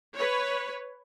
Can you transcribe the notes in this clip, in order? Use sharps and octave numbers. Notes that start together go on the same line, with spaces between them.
B4 C#5